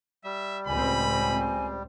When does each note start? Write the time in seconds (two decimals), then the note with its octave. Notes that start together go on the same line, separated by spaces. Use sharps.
0.24 G3 E5
0.67 C#2 A2 C4 G#5 B5